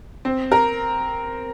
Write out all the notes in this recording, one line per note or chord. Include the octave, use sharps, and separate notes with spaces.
C4
A#4